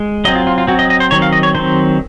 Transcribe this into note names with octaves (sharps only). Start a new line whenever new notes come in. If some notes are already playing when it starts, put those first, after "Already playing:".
Already playing: G#3
F#3 C4 D#5
F4
F4
F4
F#3 C4 F#4
D#5
D#5
C5
D#3 F#3 C4 C#5
F5
D#5
C#5
D#3 F#3 C4 C5